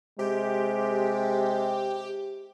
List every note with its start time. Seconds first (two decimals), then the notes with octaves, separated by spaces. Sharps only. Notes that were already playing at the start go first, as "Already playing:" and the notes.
0.19 C3 G#3 G4